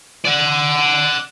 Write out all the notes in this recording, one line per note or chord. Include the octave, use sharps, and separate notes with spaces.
D5 F#5